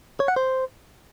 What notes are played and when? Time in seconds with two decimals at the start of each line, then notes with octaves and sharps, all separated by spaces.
0.20 C#5
0.28 F#5
0.36 C5